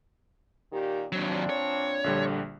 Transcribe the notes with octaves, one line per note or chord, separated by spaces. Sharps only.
A#2 D#3 G4
D#2 A#2 F#3 C4 D4
C#5
A#1 D3 G3